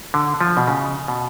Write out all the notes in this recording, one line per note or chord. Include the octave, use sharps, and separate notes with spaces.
D3
F3
B2
C#3
B2